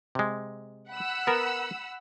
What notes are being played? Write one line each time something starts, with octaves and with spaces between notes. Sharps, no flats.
C3 G#3
F#5 B5 E6
B3 A#4